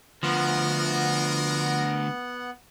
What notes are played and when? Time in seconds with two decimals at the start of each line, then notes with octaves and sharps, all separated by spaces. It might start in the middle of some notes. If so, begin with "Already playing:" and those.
0.23 D2 F3 B3 A#4 F#5